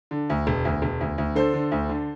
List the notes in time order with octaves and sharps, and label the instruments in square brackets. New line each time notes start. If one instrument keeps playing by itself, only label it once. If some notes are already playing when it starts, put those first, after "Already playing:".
[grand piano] D3
D2
E1
D2
E1
D2
D2
D3 A4 C5
D3
D2
D3